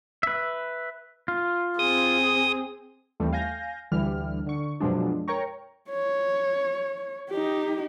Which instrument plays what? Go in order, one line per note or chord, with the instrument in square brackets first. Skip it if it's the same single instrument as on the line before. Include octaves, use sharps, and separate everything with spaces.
[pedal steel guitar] B4 E5
F4
[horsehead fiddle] C4 G#4 [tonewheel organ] D#6
[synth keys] D#2 E3 G3 A3 C4
F5 G#5 G6 A#6
D2 D3 E3 G3 F6
D3 C#6
F#2 B2 F3 F#3 G#3 D4
A#4 C#5 G5 A#5 C#6
[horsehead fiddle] C#5
D#4 G4